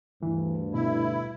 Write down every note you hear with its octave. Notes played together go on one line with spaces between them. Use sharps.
D2 G2 E3
B2 E4